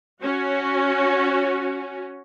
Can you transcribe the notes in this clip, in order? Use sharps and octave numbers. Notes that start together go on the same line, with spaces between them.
C#4 F#4